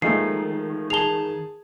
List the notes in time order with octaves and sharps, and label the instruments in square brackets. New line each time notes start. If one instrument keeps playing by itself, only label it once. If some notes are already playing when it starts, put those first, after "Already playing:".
[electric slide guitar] D#3 [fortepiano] F3 G#3 A3 [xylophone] C7
[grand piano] G#4 A5 [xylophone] F7 G7